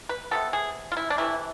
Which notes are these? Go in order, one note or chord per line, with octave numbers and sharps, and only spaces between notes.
B4
C3 F3 B3 A4
G#4
F4
E4
D4
C3 E3 A3 E4